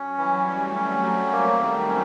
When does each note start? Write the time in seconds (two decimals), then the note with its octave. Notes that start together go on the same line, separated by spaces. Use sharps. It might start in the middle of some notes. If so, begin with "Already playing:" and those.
Already playing: F#3 C#4
0.18 E3 G3
0.47 A3 C#4
0.74 C4 C#4
1.03 F#3
1.32 A#3
1.60 D#3
1.89 C#4